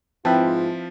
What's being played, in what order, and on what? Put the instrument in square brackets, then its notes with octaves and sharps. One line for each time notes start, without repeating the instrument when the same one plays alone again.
[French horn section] G#2 F4 [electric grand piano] F3 [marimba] C4 G5 [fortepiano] E4 B4 A5